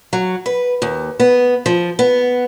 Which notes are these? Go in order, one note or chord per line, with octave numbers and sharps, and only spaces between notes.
F#3
B4
D#2
B3
F3
B3